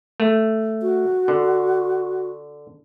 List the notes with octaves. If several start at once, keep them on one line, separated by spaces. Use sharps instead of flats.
A3
F#4
D3